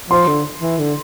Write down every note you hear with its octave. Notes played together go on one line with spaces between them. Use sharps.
F3 C6
D3
E3
D3